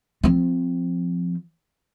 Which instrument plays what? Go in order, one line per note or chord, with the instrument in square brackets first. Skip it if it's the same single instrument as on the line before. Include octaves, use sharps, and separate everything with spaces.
[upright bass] F3 C4